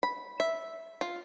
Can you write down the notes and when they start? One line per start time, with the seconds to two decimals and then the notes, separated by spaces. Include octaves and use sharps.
0.03 B5
0.40 E5
1.01 F4